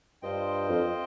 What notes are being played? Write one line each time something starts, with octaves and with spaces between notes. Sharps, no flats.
G2 F4 C5 D#5 G5
F2